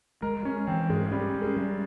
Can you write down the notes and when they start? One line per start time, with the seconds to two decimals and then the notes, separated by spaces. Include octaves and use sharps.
0.22 G#3 A#4
0.45 G#3 C#4
0.67 E3 C4
0.90 G#2 G#3
1.11 G3 C#4
1.35 C#4
1.42 G#3
1.57 G3